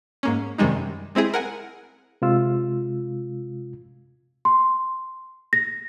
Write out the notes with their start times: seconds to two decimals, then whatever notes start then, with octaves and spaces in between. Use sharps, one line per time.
0.23 G#2 A#3 C#4
0.58 F#2 C3 D#3 G3 G#3 D#4
1.15 G#3 C4 E4 G#4
1.34 A#4 F#5 G#5
2.22 C3 G#3 F4 E6
4.45 C6
5.53 A#6